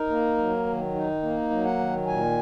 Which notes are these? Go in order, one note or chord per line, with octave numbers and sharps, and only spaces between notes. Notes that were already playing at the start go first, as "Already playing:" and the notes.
Already playing: D#4 A#4
A#3
F#3
D#3
D#4
A#3
F#3
F#5
D#3
A#2 G#5